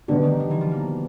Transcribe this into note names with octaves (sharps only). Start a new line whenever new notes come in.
B2 D3 G3 B3 D4 G4
D#3
D#3
E3
F3
A#3